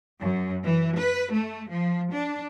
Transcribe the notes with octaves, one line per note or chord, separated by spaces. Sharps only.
F#2
E3
B4
A3
F3
D4